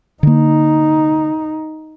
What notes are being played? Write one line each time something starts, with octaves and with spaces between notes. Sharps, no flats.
D3 A#3 D#4